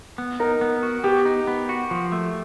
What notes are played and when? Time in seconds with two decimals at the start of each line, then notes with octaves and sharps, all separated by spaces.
0.18 B3
0.40 D#4 A#4
0.61 B3
0.83 F#4
1.04 B3 G4
1.25 D#4
1.47 B3
1.69 F#4
1.91 F3
2.12 A3